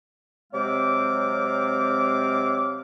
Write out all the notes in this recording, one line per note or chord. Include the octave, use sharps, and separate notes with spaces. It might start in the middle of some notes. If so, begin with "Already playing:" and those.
C3 F#3 G#3 C4 F5 D6